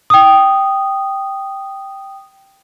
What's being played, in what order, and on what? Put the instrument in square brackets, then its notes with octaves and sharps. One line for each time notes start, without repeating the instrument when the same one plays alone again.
[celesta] G5 D#6